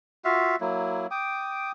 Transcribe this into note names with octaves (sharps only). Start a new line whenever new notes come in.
F4 F#4 E5 F5
F#3 A#3 E4
G5 D6 D#6